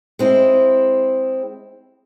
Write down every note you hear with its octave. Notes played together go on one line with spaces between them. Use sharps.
G#3 C4 E4